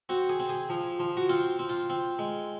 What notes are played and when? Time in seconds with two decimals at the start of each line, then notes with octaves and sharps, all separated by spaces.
0.09 C4 F#4
0.29 G#4
0.40 C4
0.49 G#4
0.70 F3
1.00 F3
1.17 F#4
1.29 C4 F4
1.59 C4
1.69 F4
1.90 C4
2.19 G#3